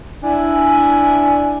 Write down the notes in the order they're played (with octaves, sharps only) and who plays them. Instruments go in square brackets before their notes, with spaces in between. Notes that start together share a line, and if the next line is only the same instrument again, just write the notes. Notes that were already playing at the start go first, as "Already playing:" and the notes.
[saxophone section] D4 E4 [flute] G#5